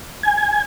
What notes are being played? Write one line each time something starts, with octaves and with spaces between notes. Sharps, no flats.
G#5